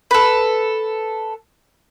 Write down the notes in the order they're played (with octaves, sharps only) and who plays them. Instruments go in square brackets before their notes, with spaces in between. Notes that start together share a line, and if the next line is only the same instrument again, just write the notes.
[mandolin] A4 B4